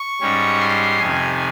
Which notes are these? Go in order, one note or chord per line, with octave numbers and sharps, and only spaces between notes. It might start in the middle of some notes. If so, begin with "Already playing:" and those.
Already playing: C#6
G#2 G3 C#4
C6
F2 C3 D#3 G#5